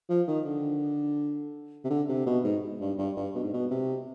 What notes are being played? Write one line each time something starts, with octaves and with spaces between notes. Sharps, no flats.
F3
D#3
D3
C3
D3
C3
B2
G#2
G2
G2
G2
B2
G#2
B2
C3